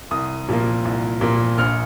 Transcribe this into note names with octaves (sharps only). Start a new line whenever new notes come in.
C2 D#6
A#2 F3 A#3
C2
A#2 F3 A#3
A#1 F6